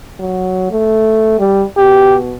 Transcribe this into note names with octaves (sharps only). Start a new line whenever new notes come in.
F#3
A3
G3
B2 G4